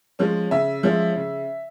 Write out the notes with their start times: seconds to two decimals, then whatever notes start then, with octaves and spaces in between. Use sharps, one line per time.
0.19 F3 G#3 C#4
0.51 C#3 E5
0.83 F3 G#3 C#4
1.16 C#3